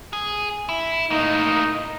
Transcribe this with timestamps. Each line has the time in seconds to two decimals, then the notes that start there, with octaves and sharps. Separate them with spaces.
0.13 G#4
0.69 E4
1.11 A2 A#3 D#4